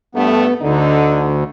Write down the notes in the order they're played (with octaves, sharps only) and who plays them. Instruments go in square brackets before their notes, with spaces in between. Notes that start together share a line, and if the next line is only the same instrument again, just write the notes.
[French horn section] G2 A3 [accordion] B3
[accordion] D2 [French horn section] D3 D#4